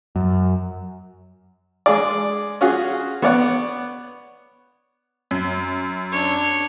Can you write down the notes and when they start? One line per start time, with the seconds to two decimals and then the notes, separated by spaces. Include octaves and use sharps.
0.16 F#2
1.86 G#3 G#4 D5
2.61 C#4 F4 F#4 G#4
3.22 B3 C#5 D5 F#5
5.31 F#2
6.12 D4 C#5